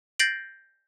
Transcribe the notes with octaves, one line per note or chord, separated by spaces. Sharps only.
G6 A6 A#6 C7 D7 F#7